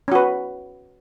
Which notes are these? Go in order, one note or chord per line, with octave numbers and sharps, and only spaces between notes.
C#4 F#4 B4